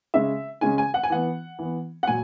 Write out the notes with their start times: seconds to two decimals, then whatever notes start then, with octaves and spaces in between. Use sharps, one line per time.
0.14 C#3 G#3 C#4 E5
0.61 C#3 G#3 C#4 G#5
0.78 G#5
0.94 F#5
1.03 G#5
1.10 E3 B3 F#5
1.59 E3 B3
2.03 F#5
2.07 A#2 F#3 G#5